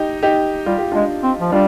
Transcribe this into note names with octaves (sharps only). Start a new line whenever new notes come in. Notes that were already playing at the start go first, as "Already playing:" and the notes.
Already playing: D#4 G4
D#4 G4
G3 F4
G4
G#3 D4 F4
C4
F3
G3 D4 F4